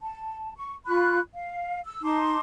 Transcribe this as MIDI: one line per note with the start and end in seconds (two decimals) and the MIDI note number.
0.01 0.53 81
0.56 0.75 85
0.86 1.19 65
0.86 1.19 83
0.86 1.19 85
0.86 1.19 90
1.33 1.79 77
1.84 2.01 88
2.02 2.40 63
2.02 2.40 81
2.02 2.40 84
2.02 2.40 86